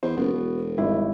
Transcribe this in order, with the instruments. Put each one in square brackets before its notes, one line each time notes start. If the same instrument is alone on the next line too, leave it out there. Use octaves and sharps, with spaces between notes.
[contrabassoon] E2 [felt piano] C5
[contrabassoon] F#1 [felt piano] B3 F#4
[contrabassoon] E1
[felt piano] G#1 G3 E4